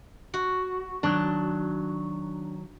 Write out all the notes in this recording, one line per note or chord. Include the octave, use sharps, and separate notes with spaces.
F#4
D#3 F#3 D4